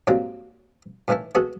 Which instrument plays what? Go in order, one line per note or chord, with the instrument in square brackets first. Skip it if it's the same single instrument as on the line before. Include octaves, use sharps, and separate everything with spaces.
[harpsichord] G#2 F#3 G3 A#3 C4
A2 D#3 E3 A3 E4
G#3 B3 F#4 G#4 A4